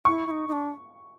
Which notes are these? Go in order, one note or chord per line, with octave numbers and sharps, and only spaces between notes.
E4 C#6
E4
D#4
D#4
D4